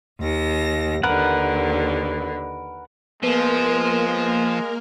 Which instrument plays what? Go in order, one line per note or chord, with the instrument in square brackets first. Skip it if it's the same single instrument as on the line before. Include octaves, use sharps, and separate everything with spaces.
[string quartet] D#2 A#6
[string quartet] D#2 D3 [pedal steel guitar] A#4 B4 F#5
[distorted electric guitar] F3 [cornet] G#3 [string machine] A#3 A#4 [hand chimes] B3 B4